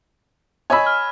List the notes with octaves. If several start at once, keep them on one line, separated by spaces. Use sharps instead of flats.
C#5 D#5 G#5 B5 E6
F6